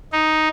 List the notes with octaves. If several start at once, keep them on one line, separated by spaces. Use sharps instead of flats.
D#4